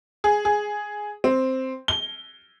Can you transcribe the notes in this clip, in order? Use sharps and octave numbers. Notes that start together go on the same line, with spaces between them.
G#4
G#4
C4
G7